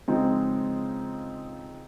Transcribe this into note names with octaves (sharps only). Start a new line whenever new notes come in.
C#3 F3 G#3 C4 D#4